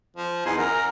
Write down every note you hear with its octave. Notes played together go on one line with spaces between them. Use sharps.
F3
E2 D#4 G#5 C6
F#2 A#4 A#5